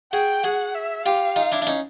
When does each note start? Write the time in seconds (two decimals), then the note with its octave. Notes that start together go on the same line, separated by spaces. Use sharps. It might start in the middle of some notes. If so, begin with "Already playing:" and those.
0.13 F#4 G#4 G5
0.43 F#4 G#4 F#5
0.75 E5
1.05 F4 G4 F5
1.36 D#4 F4
1.52 D4 E4
1.62 D4
1.67 C#4 D#4